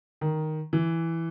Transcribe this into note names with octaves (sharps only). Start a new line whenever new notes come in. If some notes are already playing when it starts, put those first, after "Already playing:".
D#3
E3